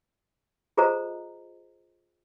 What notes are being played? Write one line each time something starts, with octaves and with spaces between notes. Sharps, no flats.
F4 G#4 A4 C5 D#5 A#5